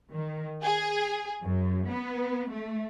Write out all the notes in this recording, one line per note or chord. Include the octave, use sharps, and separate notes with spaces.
D#3
G#4
F#2
B3
A3